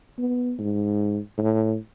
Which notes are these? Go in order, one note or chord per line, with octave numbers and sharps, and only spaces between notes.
B3
G#2
A2